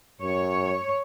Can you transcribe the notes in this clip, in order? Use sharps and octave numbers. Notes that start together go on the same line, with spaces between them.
F#2 C#5